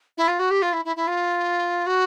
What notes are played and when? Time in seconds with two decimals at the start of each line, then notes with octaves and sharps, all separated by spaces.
0.18 E4
0.28 F4
0.39 F#4
0.50 G4
0.62 F4
0.73 E4
0.85 E4
0.96 E4
1.07 F4
1.86 F#4